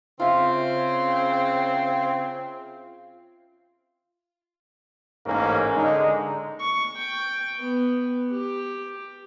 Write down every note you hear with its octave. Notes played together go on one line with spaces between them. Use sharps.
C#3 C4 F4 E5
A1 G#2 A#3 C#4
D3 G#3 D#4
C#6
G5
B3
G4